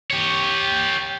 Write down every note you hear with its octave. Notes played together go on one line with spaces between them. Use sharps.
G4 C#5